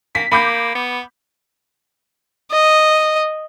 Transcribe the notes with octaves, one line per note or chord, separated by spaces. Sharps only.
A#3 B6
A#3 B5 D6 G6
B3
D#5